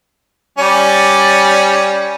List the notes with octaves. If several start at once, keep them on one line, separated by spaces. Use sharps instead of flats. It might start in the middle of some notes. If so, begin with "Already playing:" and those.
G3 C#4 D5